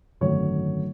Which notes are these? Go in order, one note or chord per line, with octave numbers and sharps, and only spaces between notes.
G#1 F#2 D3 F#3 A3 C#5